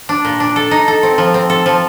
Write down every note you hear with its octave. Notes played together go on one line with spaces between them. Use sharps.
D4
A#2
D4
A4
D#4
A4
C4
F3
C4
A4
F3